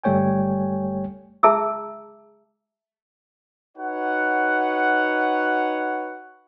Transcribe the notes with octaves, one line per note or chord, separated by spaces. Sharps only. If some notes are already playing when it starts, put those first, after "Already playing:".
G1 G3 A3 C#5 G5 G#5
G#4 E5 A5 A#5 D6 E6
D#4 F#4 B4 C#5 F#5